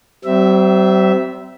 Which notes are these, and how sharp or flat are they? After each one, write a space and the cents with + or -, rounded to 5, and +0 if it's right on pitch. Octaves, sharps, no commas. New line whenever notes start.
G3 -45 C4 -20 E5 +0